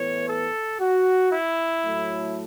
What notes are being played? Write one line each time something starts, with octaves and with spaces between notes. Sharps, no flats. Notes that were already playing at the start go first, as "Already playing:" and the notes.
Already playing: A2 E3 B3 C#5
A4
F#4
E4
A2 F#3 A3